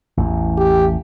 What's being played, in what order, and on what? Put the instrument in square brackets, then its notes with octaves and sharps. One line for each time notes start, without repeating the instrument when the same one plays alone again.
[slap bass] A1 E2
[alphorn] G4